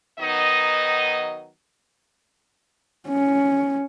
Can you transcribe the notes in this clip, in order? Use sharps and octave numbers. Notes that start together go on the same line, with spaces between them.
D#3 F#3 B3 D#4 D#5
C#4